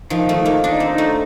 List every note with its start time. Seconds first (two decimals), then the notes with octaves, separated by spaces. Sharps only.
0.10 D#3 F3
0.29 A3
0.36 D#3
0.45 A#3
0.64 D4 D#4
0.80 C4
0.89 D#4
0.98 A3